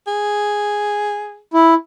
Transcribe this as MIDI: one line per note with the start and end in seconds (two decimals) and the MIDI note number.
0.07 1.40 68
1.53 1.74 64